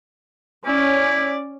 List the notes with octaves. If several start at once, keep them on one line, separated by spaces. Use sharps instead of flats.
C#4 E4 D5